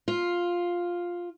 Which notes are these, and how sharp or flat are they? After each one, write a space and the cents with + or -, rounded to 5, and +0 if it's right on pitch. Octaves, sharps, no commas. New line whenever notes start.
F4 +5